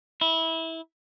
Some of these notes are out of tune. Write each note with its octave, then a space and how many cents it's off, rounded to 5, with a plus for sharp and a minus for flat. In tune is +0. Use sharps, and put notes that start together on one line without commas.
E4 -20